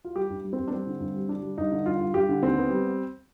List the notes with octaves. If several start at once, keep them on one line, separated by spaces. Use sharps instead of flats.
F4
G3 G4
G2
G3
C4
G2
D4
G3 C4
D3
G2
G3
D3 D4
G3
G2 D#4
D3
G2 F4
G2
G2 G4
D3
D#2 C4
B3
G3